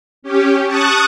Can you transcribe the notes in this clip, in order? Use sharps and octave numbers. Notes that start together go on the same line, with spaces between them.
C#4 G4
A5 C#6 D#6 F#6